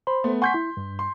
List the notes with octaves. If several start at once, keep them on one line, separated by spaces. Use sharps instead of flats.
C5 B5 C6
A3 B3
F#5 G#5 C6 C#6 G6 B6
E4
G2
C6